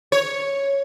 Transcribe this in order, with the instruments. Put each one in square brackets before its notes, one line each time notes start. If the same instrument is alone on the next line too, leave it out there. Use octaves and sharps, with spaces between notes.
[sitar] C#5